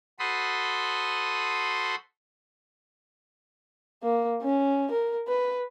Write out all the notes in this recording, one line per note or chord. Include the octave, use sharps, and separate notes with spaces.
F#4 A4 C5 B5 C6 D#6
A#3
C#4
A#4
B4